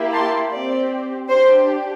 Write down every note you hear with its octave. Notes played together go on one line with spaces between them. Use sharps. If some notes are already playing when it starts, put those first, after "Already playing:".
Already playing: A#3 E4 G4
A5 C6
C4 G4 D5
D4 G4 C5